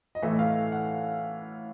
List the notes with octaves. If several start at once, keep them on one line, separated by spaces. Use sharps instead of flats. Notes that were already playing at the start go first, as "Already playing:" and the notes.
D#5
A2 E3 A3 E5
F5
F#5